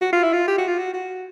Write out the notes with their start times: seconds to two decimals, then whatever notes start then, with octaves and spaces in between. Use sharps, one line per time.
0.01 F#4
0.12 F4
0.23 E4
0.33 F4
0.48 G4
0.58 F#4
0.67 F4
0.78 F#4
0.94 F#4